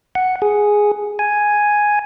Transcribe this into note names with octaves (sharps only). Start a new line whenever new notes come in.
F#5
G#4
G#5